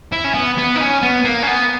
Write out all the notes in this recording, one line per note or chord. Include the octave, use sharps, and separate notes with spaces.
E4
C#4
B3
B3
D#4
C#4
B3
A#3
C#4
B3